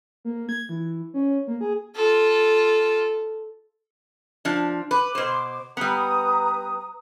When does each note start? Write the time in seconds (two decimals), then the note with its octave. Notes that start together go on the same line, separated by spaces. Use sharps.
0.25 A#3
0.49 G#6
0.69 E3
1.14 C#4
1.47 A#3
1.61 G#4
1.95 F4 A4
4.45 F3 D4
4.91 B4 D6
5.15 B2 C5
5.77 G3 B3 B4 A#5 D#6